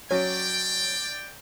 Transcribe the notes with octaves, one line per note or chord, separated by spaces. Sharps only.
F#3 C#4 D5 G5